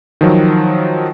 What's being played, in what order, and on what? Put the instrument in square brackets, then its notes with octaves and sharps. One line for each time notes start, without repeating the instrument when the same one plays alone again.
[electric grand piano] D#3 F3 F#3